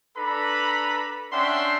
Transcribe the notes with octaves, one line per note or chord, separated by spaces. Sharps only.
D4 A4 B4 A#5 B5
C#4 D4 E5 F#5 G5 C6